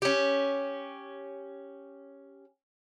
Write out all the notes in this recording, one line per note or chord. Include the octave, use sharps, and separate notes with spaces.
C#4 G4